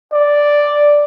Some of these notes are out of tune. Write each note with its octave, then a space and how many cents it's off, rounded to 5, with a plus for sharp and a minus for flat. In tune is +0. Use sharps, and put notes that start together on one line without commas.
D5 +0